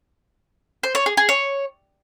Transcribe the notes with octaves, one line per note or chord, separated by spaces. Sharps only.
C5
C#5
G#4
G#4
C#5